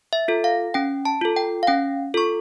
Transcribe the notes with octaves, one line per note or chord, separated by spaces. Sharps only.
E5
F4 A4
F5
C#4 G5
A5
F4 A4
G5
F5
C#4 G5
F4 A4 C#6